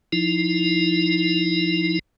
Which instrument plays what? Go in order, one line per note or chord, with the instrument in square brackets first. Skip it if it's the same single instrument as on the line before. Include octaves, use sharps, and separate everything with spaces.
[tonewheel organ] F3 D#4 E4